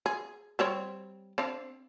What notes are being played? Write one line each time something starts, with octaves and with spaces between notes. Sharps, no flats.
G#4
G3 C4 C#5
C4 D4 F5